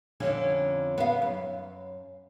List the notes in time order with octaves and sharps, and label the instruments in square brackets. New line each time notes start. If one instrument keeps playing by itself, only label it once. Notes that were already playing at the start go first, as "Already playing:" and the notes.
[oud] F2 D3 C#4
B3 F5
F#2